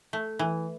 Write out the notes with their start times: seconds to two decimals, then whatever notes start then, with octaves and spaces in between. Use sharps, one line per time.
0.13 A3
0.39 E3